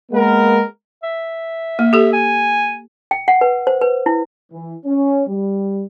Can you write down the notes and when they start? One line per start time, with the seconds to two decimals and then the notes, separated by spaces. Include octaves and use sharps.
0.12 G#3 A#3 B3 A#4
1.03 E5
1.79 A#3
1.93 G4 A4
2.13 G#5
3.11 G5
3.28 F#5
3.41 B4
3.67 C5
3.81 B4
4.06 E4
4.51 E3
4.85 C#4
5.27 G3